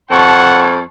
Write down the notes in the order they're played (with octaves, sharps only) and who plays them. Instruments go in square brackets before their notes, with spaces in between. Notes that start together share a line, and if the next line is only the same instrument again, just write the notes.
[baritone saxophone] F2 [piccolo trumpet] F#5 [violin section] A5 C6 C#6